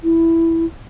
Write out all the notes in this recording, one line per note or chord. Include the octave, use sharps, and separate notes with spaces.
E4